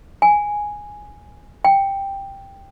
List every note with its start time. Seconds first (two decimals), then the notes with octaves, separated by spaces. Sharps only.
0.22 G#5
1.65 G5